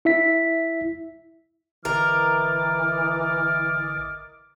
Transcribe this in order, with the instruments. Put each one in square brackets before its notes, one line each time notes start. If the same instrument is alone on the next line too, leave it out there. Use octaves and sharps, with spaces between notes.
[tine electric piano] E4 E5 B6
[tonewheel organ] G#1 D3 [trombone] E3 [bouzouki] A#4 [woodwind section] D#5 D6 F6